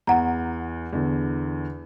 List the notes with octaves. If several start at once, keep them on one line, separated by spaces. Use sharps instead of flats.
E2 F#5 A#5
E2 D3